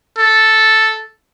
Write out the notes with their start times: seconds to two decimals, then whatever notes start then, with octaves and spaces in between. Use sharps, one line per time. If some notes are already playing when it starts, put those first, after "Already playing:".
0.18 A4